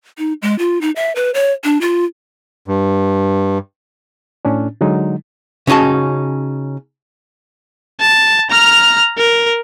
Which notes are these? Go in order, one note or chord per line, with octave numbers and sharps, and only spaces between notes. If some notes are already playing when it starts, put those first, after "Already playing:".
D#4
G#3
F4
D#4
E5
B4
C#5
D4
F4
G2
A2 C#4 D4
D3 F#3 G#3 D#4
C#3 C#4 D#4 F#4 A5
A5
A#5 F6
A#4